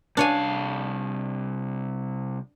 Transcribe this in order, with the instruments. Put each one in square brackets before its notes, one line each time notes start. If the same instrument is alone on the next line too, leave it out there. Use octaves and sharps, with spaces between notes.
[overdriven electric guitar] C2 F5 [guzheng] D4 C#5 G#5